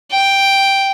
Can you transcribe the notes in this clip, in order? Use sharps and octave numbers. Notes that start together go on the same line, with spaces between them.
G5